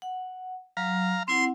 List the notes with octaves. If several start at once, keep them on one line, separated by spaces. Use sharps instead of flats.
F#5
F#3 F5 A#5
C4 E4 F#5 C6